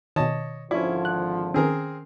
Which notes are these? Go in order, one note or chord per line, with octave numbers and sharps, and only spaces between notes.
B2 D#3 C#5 D#5 A5
G#1 D3 F3 C#4 E4 D5
F#6
D#3 C4 C#4 G#4 A#4